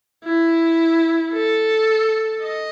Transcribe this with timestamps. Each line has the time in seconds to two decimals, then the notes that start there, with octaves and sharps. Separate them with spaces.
0.24 E4
1.33 A4
2.42 D#5